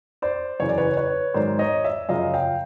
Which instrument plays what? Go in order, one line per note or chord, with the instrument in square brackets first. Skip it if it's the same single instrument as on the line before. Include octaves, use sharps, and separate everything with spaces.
[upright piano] C5 D5
F#2 C#3 E3 C#5
D5
B4 C#5
B4 C#5
G#2 D#3 F#3 C5 D5
C#5 D#5
D5 E5
F#2 C#3 F3 D#5 F5
F5 G5